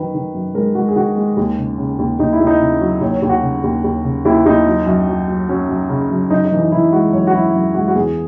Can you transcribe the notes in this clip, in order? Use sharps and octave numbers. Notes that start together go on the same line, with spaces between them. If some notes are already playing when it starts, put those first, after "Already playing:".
Already playing: F#2 D#3 B4
D#3
F#2
G#3 A#4
G#3 F#4
G#4
D#3 F#4
G#3
D#2
C#3
C#3
D#2
D#2 D#4
E4
D#2
D#4
C#3
F#3
D#2 C#5
C#5
D#2
F#4
C#3
D#2
D#2
C#3
D#2 E4
D#2 D#4
F#3
F#2
F#3
F#3
F#3 C#4
F#2
C#3
F#2
F#2 D#4
D#4
E3
D#4
E3 E4
G#3 F#4
F#2 C#5
F#4
F#2 E4
F#2
G#3 F#4
F#4
E2 G#4